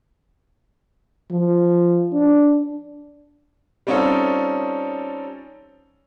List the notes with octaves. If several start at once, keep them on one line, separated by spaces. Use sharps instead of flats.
F3
D4
G3 C4 C#4 D#4 F4 A4